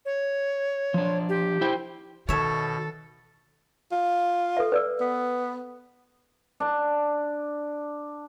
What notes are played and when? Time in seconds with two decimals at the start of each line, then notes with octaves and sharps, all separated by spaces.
0.05 C#5
0.94 F3 D4
1.29 G4
1.61 E4 C5 G5
2.29 B2 D#3 A4 C#5 E5
3.92 F4
4.57 A4 B4 E5
4.72 B4 D5 E6
5.00 B3
6.60 D4 A5